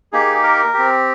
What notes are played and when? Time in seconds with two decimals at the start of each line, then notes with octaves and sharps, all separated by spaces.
0.13 A#3 D#4 G4 G#4
0.43 A#4
0.74 C4 G4